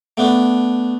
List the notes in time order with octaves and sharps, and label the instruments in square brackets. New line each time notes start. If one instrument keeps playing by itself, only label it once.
[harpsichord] A3 B3 D4